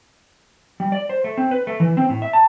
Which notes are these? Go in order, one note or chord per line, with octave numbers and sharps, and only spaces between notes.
G3
D5
C5
A3
C4
B4
A3
E3
C4
A2
E5
A5